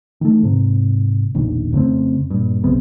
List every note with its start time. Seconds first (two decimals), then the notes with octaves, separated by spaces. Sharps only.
0.21 D#3 E3 A3
0.43 G#2 C3
1.34 E1 A#1 D#3
1.72 F2 C#3 A3 C4
2.30 G2 A#2
2.63 B1 C#3 B3 C4